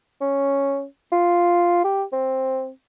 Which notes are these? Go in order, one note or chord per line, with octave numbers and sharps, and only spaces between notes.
C#4
F4
G4
C4